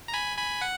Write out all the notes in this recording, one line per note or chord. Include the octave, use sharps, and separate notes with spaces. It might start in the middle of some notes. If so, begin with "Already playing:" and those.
A#5
G#5 B5
G#5 B5
F#5